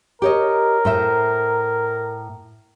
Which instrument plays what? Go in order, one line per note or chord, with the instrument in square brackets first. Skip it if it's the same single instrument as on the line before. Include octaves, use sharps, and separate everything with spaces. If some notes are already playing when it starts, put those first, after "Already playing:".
[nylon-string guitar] G4 C#5 D#5 [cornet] A#4
[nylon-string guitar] A2 C5 E5